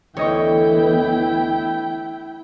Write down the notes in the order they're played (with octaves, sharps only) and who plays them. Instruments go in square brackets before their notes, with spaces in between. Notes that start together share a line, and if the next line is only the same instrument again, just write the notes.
[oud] D2 [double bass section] E3 B3 [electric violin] E4 G5 [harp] C#5 D#5 C#6